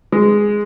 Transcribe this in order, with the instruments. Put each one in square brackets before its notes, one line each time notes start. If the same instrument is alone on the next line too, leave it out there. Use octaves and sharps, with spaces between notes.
[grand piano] G#3